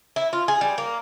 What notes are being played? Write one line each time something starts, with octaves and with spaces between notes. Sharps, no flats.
E4
F4
G#4
G3
A#3